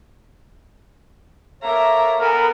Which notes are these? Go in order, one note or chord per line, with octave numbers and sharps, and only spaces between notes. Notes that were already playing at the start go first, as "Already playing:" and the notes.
A#3 A4 A#4 C#5 E5 A#5
B3 A4 A#4 G#5